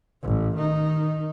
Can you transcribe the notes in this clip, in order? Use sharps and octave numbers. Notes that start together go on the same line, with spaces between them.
A1
D#3 D#4